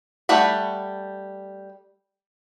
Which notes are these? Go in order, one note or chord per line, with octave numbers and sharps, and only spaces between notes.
G3 A3 F#5 B5